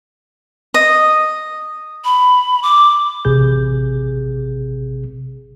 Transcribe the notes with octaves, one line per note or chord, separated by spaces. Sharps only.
D#5
B5
D6
A1 C3 G#4 G6